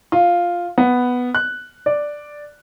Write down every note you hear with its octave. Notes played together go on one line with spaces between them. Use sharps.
F4
B3
F#6
D5